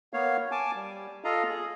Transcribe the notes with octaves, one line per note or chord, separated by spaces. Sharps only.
A#3 B3 C#5 F5
G#5 A5 D6
G3
F4 A4 D#5 F5 A#5
G#4